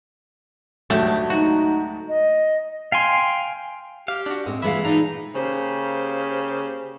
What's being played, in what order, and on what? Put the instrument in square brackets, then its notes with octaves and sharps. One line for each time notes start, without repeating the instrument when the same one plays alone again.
[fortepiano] D2 G#2 G4 [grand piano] F#3 [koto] A3
[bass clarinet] D#4 [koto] F#4
[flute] D#5
[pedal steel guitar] F5 G5 G#5 C6
[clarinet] G4 [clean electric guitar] F5
[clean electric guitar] D4 F#4
[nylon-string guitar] A2 [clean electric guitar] G#3 [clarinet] C4
[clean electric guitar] A#2 B3 E5 [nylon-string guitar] E3 G#3 F5 [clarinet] B5
[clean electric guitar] A#2 D4 A#5 [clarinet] D#4
[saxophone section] C#3 A#3 G4 C5